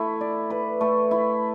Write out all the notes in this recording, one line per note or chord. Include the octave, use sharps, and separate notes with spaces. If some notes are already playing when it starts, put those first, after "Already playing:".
Already playing: A3 E4
D5
B4
A3
E4